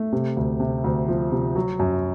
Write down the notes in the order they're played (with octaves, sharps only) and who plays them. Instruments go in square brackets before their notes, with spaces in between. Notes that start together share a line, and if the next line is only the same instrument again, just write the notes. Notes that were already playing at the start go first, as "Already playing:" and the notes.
Already playing: [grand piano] A3
C3
D2
C3
D2
F3
C3
F#3
F#2